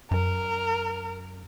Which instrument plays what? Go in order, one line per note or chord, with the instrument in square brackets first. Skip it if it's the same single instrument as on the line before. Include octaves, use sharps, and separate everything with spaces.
[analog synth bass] F#2 [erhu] A#4